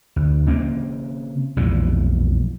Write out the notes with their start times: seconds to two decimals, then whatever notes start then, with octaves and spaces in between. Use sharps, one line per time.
0.16 D2
0.46 C#3 A#3 C4
1.57 B1 F2 A#2 E3